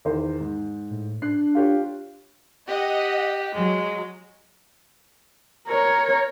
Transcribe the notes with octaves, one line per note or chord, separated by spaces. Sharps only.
E2 D#3 C5
G#2
A2
D4 F#6 C7
F4 G4 C#5
G4 D#5 F#5
F#3 G#3
A#4 C#5